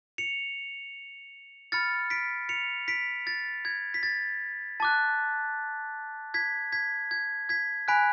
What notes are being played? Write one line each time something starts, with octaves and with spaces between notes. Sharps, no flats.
C#7 F7
B5 F6 A6 C#7
B6 D7
C#7 F7
B6 D7
A6
G#6
B6
A6
A5 D6 F#6 A6
G#6 B6
G#6 B6
G#6
G#6 B6
G#5 B5 F#6 B6 D7